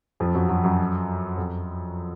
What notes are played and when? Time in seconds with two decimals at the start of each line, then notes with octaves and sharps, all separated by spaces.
0.20 F2 F3
0.34 F#2 F#3
0.49 F#2 F#3
0.64 F#2 F#3
1.37 F2 F3